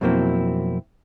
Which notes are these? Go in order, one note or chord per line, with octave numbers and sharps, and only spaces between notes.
F2 B2 F#3 A#3 C4 E4